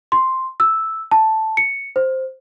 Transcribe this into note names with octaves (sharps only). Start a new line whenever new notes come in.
C6
E6
A5
C#7
C5